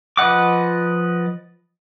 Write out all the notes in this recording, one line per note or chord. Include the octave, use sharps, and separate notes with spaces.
F3 B4 D#5 F#5 D6